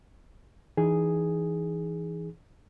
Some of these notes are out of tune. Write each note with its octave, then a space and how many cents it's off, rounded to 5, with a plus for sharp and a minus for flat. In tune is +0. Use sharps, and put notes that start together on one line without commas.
E3 +0 D#4 -10 G#4 +0